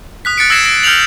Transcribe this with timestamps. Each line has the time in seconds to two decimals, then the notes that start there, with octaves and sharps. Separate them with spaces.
0.25 D#6 F#6 B6
0.38 F#6 A6 C#7 D7
0.50 E6 F#6 G#6 A#6 C7 E7
0.65 A#6 D7
0.83 F6 G6 C#7 F7 F#7